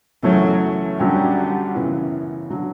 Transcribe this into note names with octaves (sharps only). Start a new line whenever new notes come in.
F#2 C#3 E3 F#3 A3 C#4
F#2 D3 F#3 G3 C#4 G4
F#2 C#3 E3 B3
D3 F#3